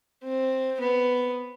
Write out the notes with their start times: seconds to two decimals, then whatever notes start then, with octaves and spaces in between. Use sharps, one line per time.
0.24 C4
0.81 B3